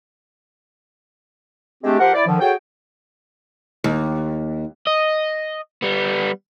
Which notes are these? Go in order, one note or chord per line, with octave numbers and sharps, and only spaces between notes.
G#3 A3 C4 D4 G4
F3 G4 A#4 C5 F#5
E4 D5
D3 D#3 F3
F#4 G#4 A4 C#5 G5
D#2
D#5
G3 B3